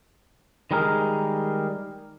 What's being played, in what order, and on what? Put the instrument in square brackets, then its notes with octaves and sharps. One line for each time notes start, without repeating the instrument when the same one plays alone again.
[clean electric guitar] D#3 G3 G#3 G#4 A#4